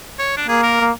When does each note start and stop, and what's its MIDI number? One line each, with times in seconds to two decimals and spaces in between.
0.19 0.37 73
0.37 0.48 62
0.48 0.76 58
0.48 0.60 68
0.62 0.84 70
0.81 0.91 58